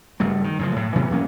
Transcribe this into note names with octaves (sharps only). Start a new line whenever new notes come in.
F#1 G2 A3
D#3
F#2 C#3 F3
A2
C3 E3 F#3 B3
F#2 A#3 C#4